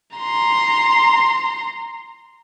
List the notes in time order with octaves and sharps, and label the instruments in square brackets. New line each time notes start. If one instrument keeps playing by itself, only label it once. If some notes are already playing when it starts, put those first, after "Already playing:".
[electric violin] A#5 C6